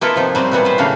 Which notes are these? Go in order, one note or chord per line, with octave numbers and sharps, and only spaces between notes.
A#3 B3 E4 F4 A4 A#4
C3 F3 D#4
F#3 G3 C4
A#2 E3 F#3 G3 B3
B4 C5
A2 C#3 G3 A#3 D4 F5